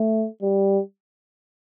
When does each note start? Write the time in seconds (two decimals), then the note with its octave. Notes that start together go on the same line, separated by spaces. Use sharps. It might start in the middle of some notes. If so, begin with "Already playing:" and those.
Already playing: A3
0.42 G3